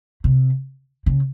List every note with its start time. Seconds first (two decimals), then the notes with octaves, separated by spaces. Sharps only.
0.24 C3
1.06 C#3